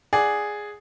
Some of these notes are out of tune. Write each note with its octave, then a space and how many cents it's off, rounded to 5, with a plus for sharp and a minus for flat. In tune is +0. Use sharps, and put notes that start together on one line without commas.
G#4 +0 D5 +0 F#5 +0